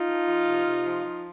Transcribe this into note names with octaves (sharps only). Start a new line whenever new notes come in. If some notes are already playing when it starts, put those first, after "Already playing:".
Already playing: D#4 F4
F3
F3
C3
C3
F3
F3